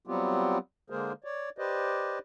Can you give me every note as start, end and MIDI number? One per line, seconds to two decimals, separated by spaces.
0.07 0.58 54
0.07 0.58 55
0.07 0.58 59
0.07 0.58 60
0.07 0.58 65
0.07 0.58 67
0.90 1.13 50
0.90 1.13 56
0.90 1.13 58
0.90 1.13 68
0.90 1.13 70
0.90 1.13 72
1.24 1.50 73
1.24 1.50 74
1.58 2.19 67
1.58 2.19 71
1.58 2.19 72
1.58 2.19 74
1.58 2.19 75